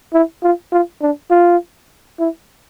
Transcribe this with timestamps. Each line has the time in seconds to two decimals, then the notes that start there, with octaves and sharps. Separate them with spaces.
0.14 E4
0.43 F4
0.72 F4
1.02 D4
1.31 F4
2.20 E4